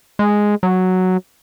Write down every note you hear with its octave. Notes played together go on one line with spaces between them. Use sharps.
G#3
F#3